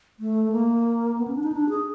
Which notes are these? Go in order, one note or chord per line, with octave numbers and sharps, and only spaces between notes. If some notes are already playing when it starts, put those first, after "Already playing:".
A3
A#3
B3
C#4
D4
D#4
D4
G#4